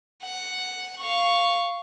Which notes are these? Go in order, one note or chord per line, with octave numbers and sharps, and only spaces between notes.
F#5
F5 C#6